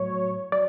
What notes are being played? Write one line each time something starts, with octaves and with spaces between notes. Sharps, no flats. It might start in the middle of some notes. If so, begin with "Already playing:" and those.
Already playing: A2 F#3 C#5
F#3 D5